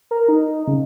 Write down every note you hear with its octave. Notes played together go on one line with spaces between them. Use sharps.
A#4
D#4
C#3